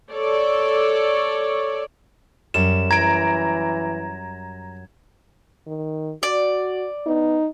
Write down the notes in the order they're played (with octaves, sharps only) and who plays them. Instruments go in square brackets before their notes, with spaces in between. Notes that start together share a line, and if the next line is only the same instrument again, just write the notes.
[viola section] A4 C#5 D5
[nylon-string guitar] F#2 G3 [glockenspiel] E7
[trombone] E3 [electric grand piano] A#5 D7 [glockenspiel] G#6
[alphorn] D#3
[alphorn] F#4 [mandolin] D5
[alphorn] B3 [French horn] D#4